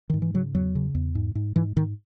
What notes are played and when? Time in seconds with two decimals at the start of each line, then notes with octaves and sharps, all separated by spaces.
0.10 G#2 D#3
0.22 E3
0.34 C#3 F#3
0.54 E2 F#3
0.75 C#3
0.95 E2
1.15 G#2
1.35 G#2
1.56 G#2 E3
1.76 G#2 D#3